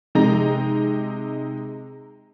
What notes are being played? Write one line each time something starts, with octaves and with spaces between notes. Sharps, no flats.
C3 G#3 D#4 A#5 A#6